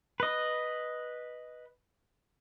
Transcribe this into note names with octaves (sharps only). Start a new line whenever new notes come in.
B4 D#5